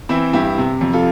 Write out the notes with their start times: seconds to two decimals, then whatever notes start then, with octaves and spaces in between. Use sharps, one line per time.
0.09 E3 C4 E4
0.33 G2 E4 G4
0.58 C3
0.81 F2
0.93 F4 A4